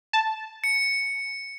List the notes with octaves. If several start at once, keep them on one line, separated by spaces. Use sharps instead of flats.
A5
C#7